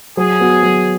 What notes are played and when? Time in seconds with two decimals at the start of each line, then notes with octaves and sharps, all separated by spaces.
0.17 F#3 G#4
0.40 B3 F#4
0.63 F#3